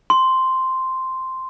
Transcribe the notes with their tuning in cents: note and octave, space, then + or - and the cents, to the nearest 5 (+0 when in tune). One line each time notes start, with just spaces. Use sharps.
C6 -5